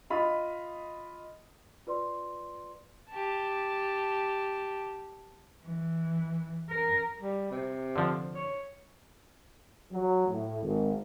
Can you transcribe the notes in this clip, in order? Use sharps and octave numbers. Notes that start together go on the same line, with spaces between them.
F4 D#5 B5
F4 B4 D5 C6
G4 A5
E3
A#4
G3
C3
D3 F3
C#5
F#3
A2
G#1